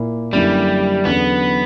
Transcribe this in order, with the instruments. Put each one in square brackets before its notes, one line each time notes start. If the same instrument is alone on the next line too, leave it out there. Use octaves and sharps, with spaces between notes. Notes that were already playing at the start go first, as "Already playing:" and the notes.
Already playing: [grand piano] A#2 A#3 E4
[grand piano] F#2 D3 A#3 C#4 E4 [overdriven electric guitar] G3
[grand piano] E2 D3 F#3 C#4 [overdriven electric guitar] B3